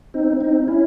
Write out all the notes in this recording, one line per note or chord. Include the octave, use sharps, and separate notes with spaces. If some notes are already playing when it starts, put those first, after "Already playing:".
C4 D#4
C4 D#4
C#4 E4